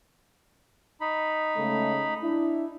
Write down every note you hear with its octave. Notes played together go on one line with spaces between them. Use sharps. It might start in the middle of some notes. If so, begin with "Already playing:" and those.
D#4 B5
C#3 G#3 A3
D4 E4